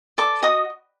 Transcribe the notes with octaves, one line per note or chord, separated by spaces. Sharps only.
A4 D5 D6
F#4 D#5 D#6